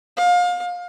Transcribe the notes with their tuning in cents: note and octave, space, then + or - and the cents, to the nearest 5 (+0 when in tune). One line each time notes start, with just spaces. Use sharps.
F5 +30